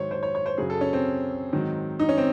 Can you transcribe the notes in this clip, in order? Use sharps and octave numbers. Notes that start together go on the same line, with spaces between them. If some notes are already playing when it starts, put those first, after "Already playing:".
Already playing: G#2 D#3 F#3 C5 C#5
C5
C#5
C#5
C5
F#2 C#3 F#3 G#4
A4
C#4
C4
G#2 D#3 F#3
D#4
C#4
C4